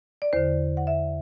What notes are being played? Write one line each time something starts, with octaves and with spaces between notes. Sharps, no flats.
D5
E2 D3 C5
F#5
E5